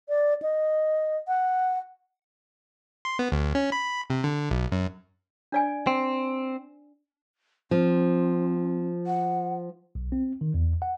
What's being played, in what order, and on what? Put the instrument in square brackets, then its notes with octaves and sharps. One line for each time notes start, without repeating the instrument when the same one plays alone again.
[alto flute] D5
D#5
F#5
[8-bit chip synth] C6
B3
D2
C#4
B5
C3
D3
B1
F#2
[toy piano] D4 D5 G#5
[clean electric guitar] C4
[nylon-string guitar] F3 [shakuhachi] C4
[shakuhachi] F#5
[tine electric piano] B1
C4
D#3
E2
F#5